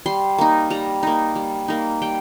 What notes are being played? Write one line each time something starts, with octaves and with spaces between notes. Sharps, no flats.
G3 C6
A#3 D#4
G3 A#5
A#3 D#4
G3
A#3 D#4
G3 G5